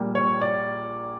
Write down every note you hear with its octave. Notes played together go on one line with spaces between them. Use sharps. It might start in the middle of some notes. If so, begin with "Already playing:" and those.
Already playing: A#1 A#2 G3 A#3
C#5
D5